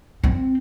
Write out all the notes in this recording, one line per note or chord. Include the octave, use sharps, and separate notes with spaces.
C4